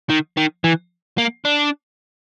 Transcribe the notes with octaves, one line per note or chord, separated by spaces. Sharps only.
D#3
D#3
E3
A#3
D4